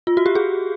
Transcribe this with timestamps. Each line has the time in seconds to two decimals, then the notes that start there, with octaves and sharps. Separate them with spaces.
0.07 F4
0.17 F#4
0.26 G4
0.35 G#4